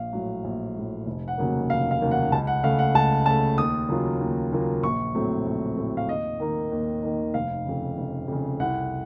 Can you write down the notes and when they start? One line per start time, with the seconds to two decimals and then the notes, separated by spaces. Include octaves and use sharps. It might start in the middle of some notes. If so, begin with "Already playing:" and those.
Already playing: A#1 F5
0.13 A2 F#3
0.44 A#1
0.75 A2 F#3
1.06 F1
1.28 F#5
1.38 D#2 C#3 F#3 A#3
1.69 F1 F5
1.91 F5
2.01 D#2 C#3 F#3 A#3
2.11 F#5
2.32 C#2 A5
2.47 F#5
2.63 C#3 A3 F5
2.79 F#5
2.95 C#2 A5
3.26 C#3 A3 A5
3.57 D#2 D#6
3.89 C#3 F#3 A#3 F4
4.21 D#2
4.52 C#3 F#3 A#3 F4
4.83 A#1 C#6
5.15 A2 F#3 A3 C4
5.46 A#1
5.77 A2 F#3 A3 C4
5.97 F5
6.08 D#2 D#5
6.40 D#3 A#3 D#4
6.71 D#2
7.02 D#3 A#3 D#4
7.34 F1 F5
7.65 F2 C#3
7.98 F1
8.28 F2 C#3
8.60 C2 F#5